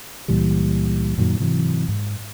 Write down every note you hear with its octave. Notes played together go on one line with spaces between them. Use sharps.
C#2 A#2 E3 G3
F#2 A#2 D#3 F#3
G#2 C3 E3 F#3
G#2